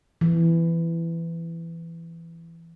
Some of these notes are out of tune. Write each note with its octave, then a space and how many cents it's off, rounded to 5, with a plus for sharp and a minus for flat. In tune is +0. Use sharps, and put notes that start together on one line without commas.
E3 +15